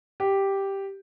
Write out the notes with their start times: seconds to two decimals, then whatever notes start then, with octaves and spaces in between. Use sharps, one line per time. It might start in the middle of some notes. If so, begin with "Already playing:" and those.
0.20 G4